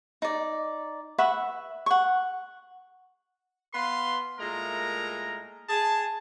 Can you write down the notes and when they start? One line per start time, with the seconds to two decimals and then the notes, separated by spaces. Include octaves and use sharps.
0.22 D#4 D5
1.18 B4 E5 F#5 C#6
1.86 F#5 C#6
3.74 B3 B4 F5 C6
4.39 A#2 G#3 A3 E4 A#4 A#5
5.69 G#4 A5